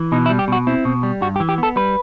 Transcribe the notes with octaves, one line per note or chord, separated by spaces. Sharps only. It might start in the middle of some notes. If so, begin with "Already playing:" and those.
Already playing: E3
B2 D#4
E4
G3
G4
B2 F#4
C4 E4
B2
G3
G2 F#4
G4
E3
G4
B3 A4
G3 B4